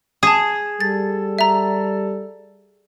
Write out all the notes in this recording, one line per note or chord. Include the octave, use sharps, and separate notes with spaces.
G#4 A5 D#6
G3 A4 A6
E5 A#5